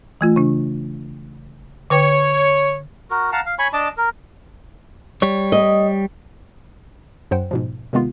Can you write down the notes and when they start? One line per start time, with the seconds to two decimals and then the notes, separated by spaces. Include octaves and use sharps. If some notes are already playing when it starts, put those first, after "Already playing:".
0.21 E3 A3 F4
0.36 C#3 D4
1.90 D3 B4 C#5 G5
3.10 F#4 A#4
3.32 F5 F#5 A5 A#5
3.46 F5
3.59 C#5 G#5 B5 C#6
3.73 D4 D#5 A5 D6
3.97 A#4
5.22 G3 C#5
5.52 D#5
7.31 F#2 F#3 C5 F#5 G5
7.51 G#2 B2 F3
7.93 C3 D#3 G#3 B3 F4